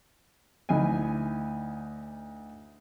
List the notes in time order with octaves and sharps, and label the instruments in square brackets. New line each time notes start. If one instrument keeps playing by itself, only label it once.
[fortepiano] D2 D#4 E4 G#5